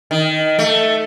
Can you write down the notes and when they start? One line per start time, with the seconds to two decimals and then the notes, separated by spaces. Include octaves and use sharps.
0.11 D#3
0.59 A3